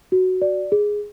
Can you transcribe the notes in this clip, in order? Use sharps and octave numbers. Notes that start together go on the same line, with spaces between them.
F#4
D5
G#4